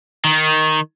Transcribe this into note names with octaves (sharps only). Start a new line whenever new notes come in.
D#3